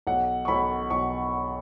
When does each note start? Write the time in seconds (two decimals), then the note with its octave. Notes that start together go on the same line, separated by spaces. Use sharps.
0.07 B1 F#5
0.45 C#6
0.48 B1 B5
0.90 B1 C#6